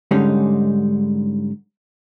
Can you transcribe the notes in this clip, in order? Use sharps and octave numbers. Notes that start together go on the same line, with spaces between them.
G#2 D3 G3 G#3 C#4 D#4